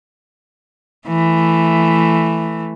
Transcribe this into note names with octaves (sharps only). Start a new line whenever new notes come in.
E3 A3